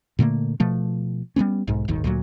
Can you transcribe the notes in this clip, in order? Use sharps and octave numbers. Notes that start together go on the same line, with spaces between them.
A#2 D3 A3 A#3
B2 F3 A3
G3 A#3 B3 C#4
B1 G#2
D#1 G#1 D#2 D#3
D2 A#2 E3 F#3